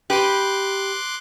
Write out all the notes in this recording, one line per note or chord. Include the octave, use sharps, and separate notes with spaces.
G4 B4 C6 D6 F#6